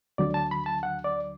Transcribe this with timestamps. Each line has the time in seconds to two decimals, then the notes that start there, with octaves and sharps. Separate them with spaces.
0.18 D2 D3 F#3 D5
0.34 A5
0.51 B5
0.66 A5
0.83 F#5
1.04 D5